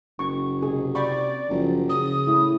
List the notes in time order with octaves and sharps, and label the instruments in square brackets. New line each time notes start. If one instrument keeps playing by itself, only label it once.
[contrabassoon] F#1 [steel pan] C#6
[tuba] C3 [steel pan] G#4
[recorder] D5 [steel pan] G5 B5 C#6
[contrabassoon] F#1 [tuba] F3
[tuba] C#3 [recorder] D#6
[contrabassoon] A2 [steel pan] E4